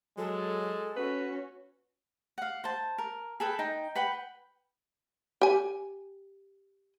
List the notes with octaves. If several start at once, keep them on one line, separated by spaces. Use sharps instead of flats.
F#3 G#3 A4
C#4 F#4 B4 C#5
F5 F#5
C5 A5
A#4
G#4 A4 B4 G5
D#4 G5
B4 F#5 G5 B5
G4 G#5